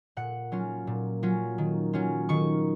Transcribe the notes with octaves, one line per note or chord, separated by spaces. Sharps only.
A#2 F#5
F#3 C#4 F4
A#2
F#3 C#4 F4
D#3
F#3 C#4 F4
D#3 C#6